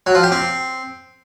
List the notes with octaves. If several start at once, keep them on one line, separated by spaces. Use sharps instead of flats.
F#3
F3
G4
C4